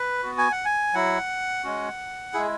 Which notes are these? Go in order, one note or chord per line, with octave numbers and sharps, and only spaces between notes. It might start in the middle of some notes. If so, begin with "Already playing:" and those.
Already playing: B4
B3 F#4
G#5
F#5
G#5
F#3 E4 F#5
G#3 C#4 F#4
G#3 E4 G#4